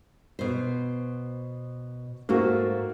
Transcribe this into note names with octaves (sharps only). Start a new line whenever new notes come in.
B2 C5
G#2 A3 A#3 F#4